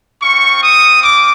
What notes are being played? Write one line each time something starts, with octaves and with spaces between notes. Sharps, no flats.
C4 F4 C#6
D#6
D6